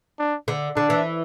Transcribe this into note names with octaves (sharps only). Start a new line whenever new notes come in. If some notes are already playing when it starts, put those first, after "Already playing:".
D4
D3
D3 D4
E3